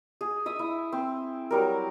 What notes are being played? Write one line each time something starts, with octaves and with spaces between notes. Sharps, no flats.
G#4
E5 D#6 E6
E4
C4
F#3 G3 A#4